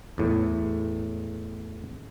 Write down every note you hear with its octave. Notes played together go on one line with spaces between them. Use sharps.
E2 A2